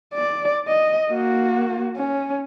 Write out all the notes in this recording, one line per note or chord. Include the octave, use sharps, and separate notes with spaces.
D5
D#5
A#3 F#4
C#4